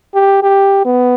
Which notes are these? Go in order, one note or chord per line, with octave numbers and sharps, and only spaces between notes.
G4
G4
B3